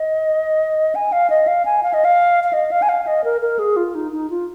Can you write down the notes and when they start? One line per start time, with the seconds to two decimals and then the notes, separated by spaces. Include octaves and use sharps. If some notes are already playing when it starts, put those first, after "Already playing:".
Already playing: D#5
0.95 G#5
1.12 F5
1.30 D#5
1.47 F5
1.65 G#5
1.83 F5
1.94 D#5
2.05 F5
2.44 F5
2.53 D#5
2.71 F5
2.82 G#5
2.89 F5
3.07 D#5
3.24 A#4
3.41 A#4
3.59 G#4
3.76 F4
3.95 D#4
4.12 D#4
4.30 F4